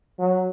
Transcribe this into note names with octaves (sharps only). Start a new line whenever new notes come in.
F#3